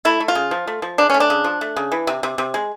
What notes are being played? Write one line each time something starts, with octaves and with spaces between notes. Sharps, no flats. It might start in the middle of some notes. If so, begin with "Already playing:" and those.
A3 E4
A3
F4
C#3
F3
A3
F3
C#3 D4
A3 C#4
D4
C#3
F3
A3
C#3
E3
C3
C3
C3
G#3